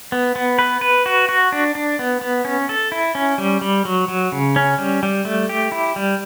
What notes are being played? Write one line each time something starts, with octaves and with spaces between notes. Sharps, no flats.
B3
B3
B4
B4
F#4
F#4
D4
D4
B3
B3
C#4
A4
E4
C#4
G3
G3
F#3
F#3
C#3
C#4
G3
G3
A3
G4
E4
G3